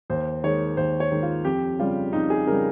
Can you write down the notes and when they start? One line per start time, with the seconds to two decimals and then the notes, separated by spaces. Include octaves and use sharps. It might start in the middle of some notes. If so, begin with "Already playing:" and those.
0.10 D#2 C5
0.44 D#3 G#3 C#5
0.77 D#2 C5
1.00 C#5
1.11 D#3 G#3
1.23 F4
1.45 F2 G4
1.79 C#3 G3 F4
2.13 F2 D#4
2.30 G#4
2.47 C#3 G3 A#4